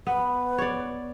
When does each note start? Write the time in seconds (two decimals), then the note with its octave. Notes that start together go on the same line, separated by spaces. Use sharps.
0.07 B3 B4
0.58 C#5 D5